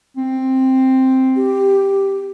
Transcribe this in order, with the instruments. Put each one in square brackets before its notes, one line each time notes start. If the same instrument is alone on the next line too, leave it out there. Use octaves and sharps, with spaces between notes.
[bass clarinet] C4
[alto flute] G4